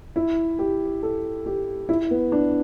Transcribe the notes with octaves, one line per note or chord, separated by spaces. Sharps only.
E4
G4
A4
G4
E4
B3
D4